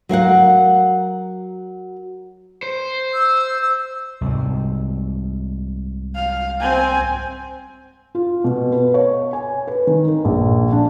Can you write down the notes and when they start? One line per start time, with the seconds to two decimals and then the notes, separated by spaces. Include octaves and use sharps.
0.09 F#3 A#4 F5 F#5
2.63 C5
3.14 E6
3.62 E6
4.21 C2 G#2
6.15 F5
6.61 C4 G#5
8.15 F4
8.44 B2
8.72 B4
8.94 C#5
9.33 G#5
9.67 B4
9.87 D#3
10.08 A#4
10.25 A#1
10.72 D4